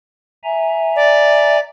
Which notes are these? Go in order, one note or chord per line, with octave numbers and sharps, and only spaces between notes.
E5 G#5 A#5
D5